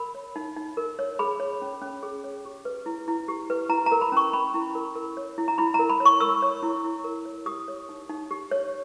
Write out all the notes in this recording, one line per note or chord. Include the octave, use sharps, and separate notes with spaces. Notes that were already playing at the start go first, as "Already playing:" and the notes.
Already playing: A#4 B5
C#5
D#4
D#4
A#4
C#5
G#4 B5
C#5
C#4
C#4
G#4
C#5
G4
B4
E4
E4
G4
B4
E4 A#5
A#5
A#4
B5
C#4 C#6
C#4 B5
E4
A#4
A#4
C#5
E4
A#5
E4 B5
A#5
A#4
B5
C#5
C#6
A#4 E6
C#5
E4
E4
A#4
C#5
G4 D#6
C#5
D#4
D#4
G4
C#5